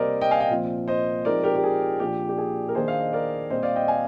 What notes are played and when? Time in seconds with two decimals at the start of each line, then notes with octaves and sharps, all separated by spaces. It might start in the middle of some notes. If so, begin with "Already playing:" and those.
Already playing: C3 G3 A#3 A#4 C5 D5 D#5
0.21 D#5 G5
0.31 F5 G#5
0.40 D#5 G5
0.50 A#2 F3 C4
0.88 C5 D#5
1.25 F3 G#3 C4 D#4 A#4 D5
1.44 G4 A#4
1.55 G4
1.63 G#4
2.00 A#2 F3 A#3 D4 G4
2.29 G4
2.38 G#4
2.68 A#4
2.75 D#3 A#3 D4 G#4 C5
2.88 F5
3.00 D#5
3.13 A#4 D5
3.50 A#2 G3 C4 C5 D#5
3.63 D5 F5
3.76 D#5 G5
3.88 F5 G#5